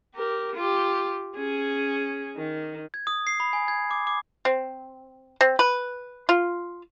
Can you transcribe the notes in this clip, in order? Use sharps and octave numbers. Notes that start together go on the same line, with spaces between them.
G4 A#4
F4 G4
C#4 G#4
D#3
G#6
D#6
C7
B5
G#5
G#6
D6
D6
C4
C4
B4
F4